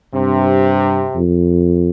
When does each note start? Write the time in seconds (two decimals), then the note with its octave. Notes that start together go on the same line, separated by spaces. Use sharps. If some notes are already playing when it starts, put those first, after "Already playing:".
0.14 G2 C3
1.15 F2